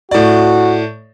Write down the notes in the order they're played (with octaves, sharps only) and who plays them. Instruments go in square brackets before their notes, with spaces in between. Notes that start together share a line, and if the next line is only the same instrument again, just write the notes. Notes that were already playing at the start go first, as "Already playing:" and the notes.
[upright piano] A2 D5 [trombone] F#4